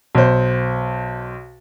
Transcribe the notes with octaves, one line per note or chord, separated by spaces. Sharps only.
B1 C5